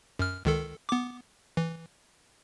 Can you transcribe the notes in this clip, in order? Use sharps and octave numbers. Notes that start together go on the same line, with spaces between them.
F#2 F6
C#2 D#3 A4
B3 D6
E3